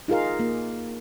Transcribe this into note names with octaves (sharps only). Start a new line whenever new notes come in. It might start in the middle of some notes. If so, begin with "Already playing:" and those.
D#4 F4 G#4 A#4 F5
A#3